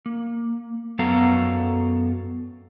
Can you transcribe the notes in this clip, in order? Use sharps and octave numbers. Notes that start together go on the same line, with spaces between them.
A#3
F#2 F#3 B3 A4 F5 A#5